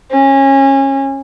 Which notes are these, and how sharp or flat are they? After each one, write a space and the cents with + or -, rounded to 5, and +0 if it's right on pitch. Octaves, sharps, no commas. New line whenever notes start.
C#4 -25